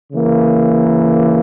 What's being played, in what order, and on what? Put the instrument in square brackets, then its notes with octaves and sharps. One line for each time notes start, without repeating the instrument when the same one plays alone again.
[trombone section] C#3 E3 A#3